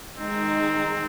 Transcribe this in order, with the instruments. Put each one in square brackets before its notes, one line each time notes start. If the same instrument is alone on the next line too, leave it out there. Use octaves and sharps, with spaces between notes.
[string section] D#3 G#3 D#4 [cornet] C4